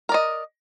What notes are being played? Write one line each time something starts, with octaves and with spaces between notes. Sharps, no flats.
A#4 D5 D#5